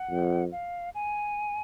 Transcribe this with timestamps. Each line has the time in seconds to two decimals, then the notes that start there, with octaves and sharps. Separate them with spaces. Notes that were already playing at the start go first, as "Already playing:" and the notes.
Already playing: F#5
0.10 F2
0.52 F5
0.95 G#5